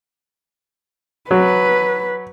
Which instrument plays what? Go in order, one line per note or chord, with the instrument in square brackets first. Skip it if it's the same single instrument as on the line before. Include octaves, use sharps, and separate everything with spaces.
[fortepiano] F#3 [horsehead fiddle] B4